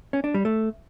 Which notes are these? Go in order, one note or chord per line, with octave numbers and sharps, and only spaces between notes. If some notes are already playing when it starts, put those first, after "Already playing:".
C#4
D4
G3
A3